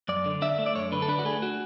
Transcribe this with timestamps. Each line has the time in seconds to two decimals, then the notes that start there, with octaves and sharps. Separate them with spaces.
0.08 F#2 D5
0.26 D3
0.42 D4 E5
0.58 A3
0.66 D5
0.75 F#2 C#5
0.92 D3 B4
1.02 A4
1.08 D4 B4
1.19 F#4
1.25 A3 G#4
1.42 F#4